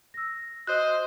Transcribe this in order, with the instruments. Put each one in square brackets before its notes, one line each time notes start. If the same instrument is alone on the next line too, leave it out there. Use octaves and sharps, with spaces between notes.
[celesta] E6 A#6
[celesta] F#4 [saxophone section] C5 D#5 [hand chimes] F#6